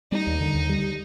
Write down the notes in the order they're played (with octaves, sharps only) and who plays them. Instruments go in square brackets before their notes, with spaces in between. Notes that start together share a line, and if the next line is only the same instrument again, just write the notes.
[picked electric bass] G3 [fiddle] D#4
[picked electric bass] D#2
D3
D#2
G3